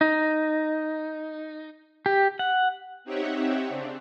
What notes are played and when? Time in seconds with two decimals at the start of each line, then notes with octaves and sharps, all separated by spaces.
0.01 D#4
2.06 G4
2.39 F#5
3.04 C4 D#4 G4 C#5 E5 F#5
3.67 C#3 C4 D4